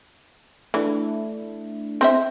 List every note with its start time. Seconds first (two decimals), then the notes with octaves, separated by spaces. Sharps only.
0.74 E3 A3 D4 E4
2.01 C4 C5 E5